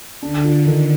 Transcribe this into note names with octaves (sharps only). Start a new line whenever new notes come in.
D3 D4
F4
D#3